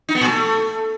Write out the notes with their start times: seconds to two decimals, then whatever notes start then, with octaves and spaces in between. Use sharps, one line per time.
0.09 D#4
0.15 B3
0.21 A#2
0.28 A3